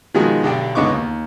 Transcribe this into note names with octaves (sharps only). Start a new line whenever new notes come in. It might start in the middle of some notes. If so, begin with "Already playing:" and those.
B2 D#3 F3 G#3 F#4 G#4
B1 D3 D4 G4 D5 G5
C#2 D3 B3 D#4 C#6 D6
D#2